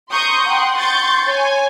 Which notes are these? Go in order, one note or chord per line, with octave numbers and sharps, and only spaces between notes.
A#5 C6 C#6 D#6 G6
F#5 G5 C6
C6 C#6 G6 A6
C#5 G#5